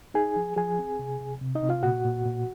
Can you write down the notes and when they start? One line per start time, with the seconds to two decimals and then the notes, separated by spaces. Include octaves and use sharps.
0.14 D#4 G#4 G#5
0.36 F3
0.56 F3 G#4 G#5
0.79 C4
0.99 C3
1.20 C3
1.41 C3
1.55 D#4 D#5
1.63 C3
1.69 F4 F5
1.83 A#2 F#4 F#5
2.05 A#2
2.25 A#2